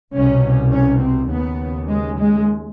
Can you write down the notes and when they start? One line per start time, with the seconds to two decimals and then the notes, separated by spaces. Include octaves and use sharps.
0.13 C2 B2 C#4
0.71 C#4
1.01 C4
1.30 D#2 C#3 B3
1.88 G#3
2.18 G#3